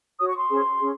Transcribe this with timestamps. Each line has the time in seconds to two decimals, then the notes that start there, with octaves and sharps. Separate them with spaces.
0.18 F#4 C#5 D#6
0.28 C#6
0.38 C6
0.49 C#4 G#4 C5
0.79 C#4 G#4